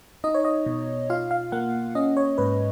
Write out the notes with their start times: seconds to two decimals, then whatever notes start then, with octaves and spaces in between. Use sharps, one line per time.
0.24 D#4 D#5
0.35 C#5
0.45 D#5
0.66 B2
1.10 F4 F5
1.31 F5
1.52 A#3 F#5
1.95 C#4 D#5
2.17 C#5
2.38 G#2 B4